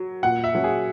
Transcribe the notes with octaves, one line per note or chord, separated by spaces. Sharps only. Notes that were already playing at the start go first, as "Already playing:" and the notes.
Already playing: F#3
A#2 F#5
E5
F#3 C#4
G#4